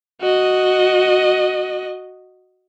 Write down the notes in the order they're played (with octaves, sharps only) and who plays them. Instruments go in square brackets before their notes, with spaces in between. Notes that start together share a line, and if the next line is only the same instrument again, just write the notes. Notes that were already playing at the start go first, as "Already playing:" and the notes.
[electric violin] F#4 D#5